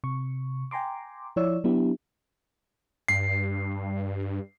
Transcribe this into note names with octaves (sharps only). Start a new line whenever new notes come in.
C3 C#6
G5 G#5 A#5 C6 D6
F3 E4 C#5 D5 E6
F#3 B3 D4 E4 G4
G2 C7